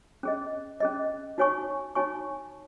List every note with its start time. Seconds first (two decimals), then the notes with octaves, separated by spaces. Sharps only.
0.23 C#4 G#4 D#5
0.80 C#4 G#4 D#5
1.38 D#4 F#4 C#5 G#5 C#6
1.95 D#4 F#4 C#5 G#5 C#6